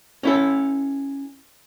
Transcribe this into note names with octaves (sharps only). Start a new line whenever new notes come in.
C#4 E4 A4